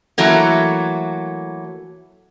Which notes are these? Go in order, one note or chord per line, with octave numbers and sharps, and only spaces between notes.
E3 F#3 A3 A#3